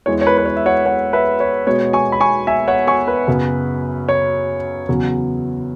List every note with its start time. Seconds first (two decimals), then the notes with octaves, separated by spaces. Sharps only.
0.06 E2 E3 G#3 C#5
0.21 C#5
0.27 B4
0.38 B4
0.46 C#5
0.57 E5
0.66 C#5 F#5
0.86 C#5 F#5
1.13 B4 E5
1.40 C#5
1.67 B2 G#3 B3 C#5
1.93 G#5 C#6
2.12 B5
2.20 G#5 C#6
2.47 E5 G#5
2.68 C#5 F#5
2.87 G#5 C#6
3.08 B4
3.27 F#2 C#3 F#3 B3
4.09 C#5
4.89 E2 C#3 F#3 B3